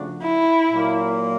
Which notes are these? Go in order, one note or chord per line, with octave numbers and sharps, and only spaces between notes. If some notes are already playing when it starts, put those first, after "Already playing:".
Already playing: C#3 F3 A3 D4 F#4
E4
A#2 F#3 A#3